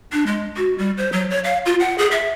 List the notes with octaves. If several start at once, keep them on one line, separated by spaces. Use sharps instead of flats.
D4
G#3
F#4
G3
C5
F#3
C#5
F5
F4
F#5
G#4
E5